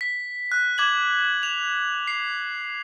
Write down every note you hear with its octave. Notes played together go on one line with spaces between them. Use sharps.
B6
F#6
D6 G#6 F#7
F7
C7